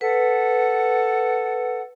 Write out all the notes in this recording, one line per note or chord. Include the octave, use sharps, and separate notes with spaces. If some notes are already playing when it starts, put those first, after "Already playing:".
A4 B4 F#5